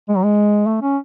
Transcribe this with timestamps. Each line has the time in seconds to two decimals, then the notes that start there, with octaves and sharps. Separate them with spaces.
0.09 G#3
0.16 F#3
0.24 G#3
0.67 A3
0.82 C#4